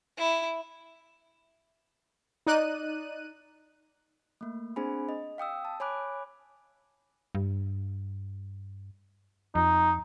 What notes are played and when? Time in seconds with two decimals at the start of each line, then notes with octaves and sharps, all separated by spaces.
0.18 E4
2.47 D#4 D5 F#6 D#7
4.41 A3 A#3
4.76 C4 D4 G#4 C5 G#5 B5
5.09 D#5
5.38 F5 G5 D#6 E6
5.65 A5
5.80 C#5 G#5 B5 D6 F#6
7.35 G2
9.55 F2 D#4